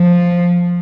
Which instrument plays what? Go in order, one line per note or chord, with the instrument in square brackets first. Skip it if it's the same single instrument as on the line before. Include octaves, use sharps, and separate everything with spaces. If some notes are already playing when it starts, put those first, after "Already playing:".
Already playing: [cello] F3